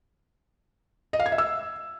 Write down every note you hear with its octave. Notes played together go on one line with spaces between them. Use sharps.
D#5
F5
G#6
E5
E6